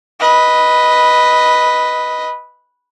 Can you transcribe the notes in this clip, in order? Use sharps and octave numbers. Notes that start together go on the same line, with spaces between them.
B4 D#5